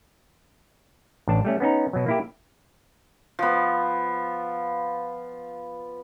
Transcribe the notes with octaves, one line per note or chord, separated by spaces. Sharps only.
A1 D4 A5
G3 A3 C#4
B3 C#4 D#4 A#5
B2 F#3
A#3 E4 G4
F3 B3